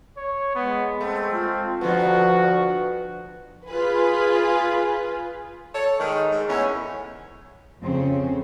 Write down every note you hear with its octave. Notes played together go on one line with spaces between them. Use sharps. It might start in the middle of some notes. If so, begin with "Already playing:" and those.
C#5
G#3 B3
A3 C4
F4
G2 D3 F3 B3 F#4
F4 G#4 B4
A4 C#5
G#2 D#3
G#2
E2 A3 C#4
F2 C#3 C4 C#4